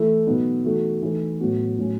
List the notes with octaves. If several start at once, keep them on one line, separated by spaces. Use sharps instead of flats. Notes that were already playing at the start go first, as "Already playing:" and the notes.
Already playing: E3 A3 E4 A4
B2 F#3 B3 D#4
E3 A3 D#4 F#4 A4
E3 A3 D#4 A4
A2 F#3 B3 F#4
A2 F#3 C#4